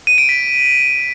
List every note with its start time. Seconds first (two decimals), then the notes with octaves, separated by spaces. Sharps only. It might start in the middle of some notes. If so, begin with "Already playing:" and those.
0.07 D#7
0.18 D7
0.29 B6